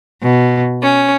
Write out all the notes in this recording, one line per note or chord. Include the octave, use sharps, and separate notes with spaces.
B2
C#4